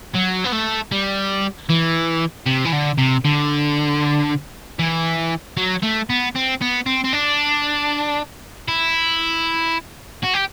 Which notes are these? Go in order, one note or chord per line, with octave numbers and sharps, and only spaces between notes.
F#3
B3
A3
G3
E3
C3
E3
D3
C3
D3
E3
F#3
A3
B3
C4
B3
C4
C4
D4
E4
F#4
G4